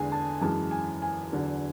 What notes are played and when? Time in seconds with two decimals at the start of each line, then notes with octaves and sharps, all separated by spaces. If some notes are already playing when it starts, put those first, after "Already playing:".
Already playing: E2 D3 G#3 G#5
0.12 A5
0.41 F#2 E3 G#3 A5
0.71 G#5
1.02 G#5
1.32 E2 D3 F#3